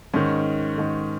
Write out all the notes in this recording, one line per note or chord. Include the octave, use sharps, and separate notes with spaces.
G#2 D#3 C#4
G#2 D#3